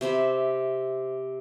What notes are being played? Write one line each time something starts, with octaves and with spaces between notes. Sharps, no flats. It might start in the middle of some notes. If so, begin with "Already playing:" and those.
C3 C5 E5 B5